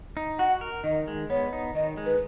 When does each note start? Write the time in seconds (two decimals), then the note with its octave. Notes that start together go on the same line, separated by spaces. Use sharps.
0.17 D#4
0.39 F#4 F#5
0.61 A#4
0.84 D#3 D#5
1.08 G#3
1.30 B3 C#5
1.53 D#4
1.75 D#3 D#5
1.97 G#3
2.06 B4